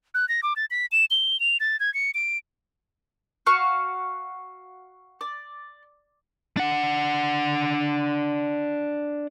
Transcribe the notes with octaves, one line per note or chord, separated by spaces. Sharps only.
F#6
A#6
D6
A6
B6
E7
G7
F7
A6
G#6
C#7
D7
F#4 F5 C#6
D5
D4 F#5